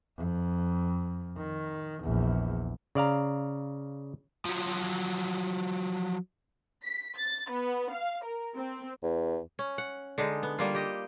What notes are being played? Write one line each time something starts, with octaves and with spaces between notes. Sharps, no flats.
F2
D#3
A#1 E2
C#3 D5 F5 A#5
F3 F#3
B6
A6
B3
F5
A#4
C4
E2
C#4
F#5
D3 G#3 D#4
B3
G3 A#3 F4
G4 D#5